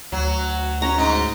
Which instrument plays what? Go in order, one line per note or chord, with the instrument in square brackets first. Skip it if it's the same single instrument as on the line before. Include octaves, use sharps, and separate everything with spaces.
[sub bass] D2 [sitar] F#3
[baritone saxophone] C#4 [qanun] A#5
[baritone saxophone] G#2 [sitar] D#4